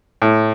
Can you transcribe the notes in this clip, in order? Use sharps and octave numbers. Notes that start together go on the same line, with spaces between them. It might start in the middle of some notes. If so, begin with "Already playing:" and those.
A2